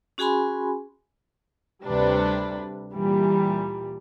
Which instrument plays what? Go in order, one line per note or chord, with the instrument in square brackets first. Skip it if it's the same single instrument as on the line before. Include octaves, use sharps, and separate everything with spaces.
[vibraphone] C#4 F#4 G#4 G#5 B5 C6
[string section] D2 C3 G3 D4 B4
A#2 E3 G3